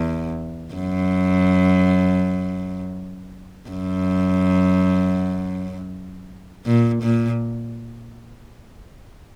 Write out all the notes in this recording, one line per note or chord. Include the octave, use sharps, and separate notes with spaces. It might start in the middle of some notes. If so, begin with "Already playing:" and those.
Already playing: E2
F#2
F#2
A#2
A#2